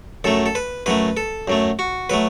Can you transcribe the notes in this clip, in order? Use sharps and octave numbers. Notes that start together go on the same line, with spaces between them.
F#2 F#3 A3 A4
A4
B4
F#2 F#3 A3 B4
A4
F#2 F#3 A3
F#4
F#3 A3 B4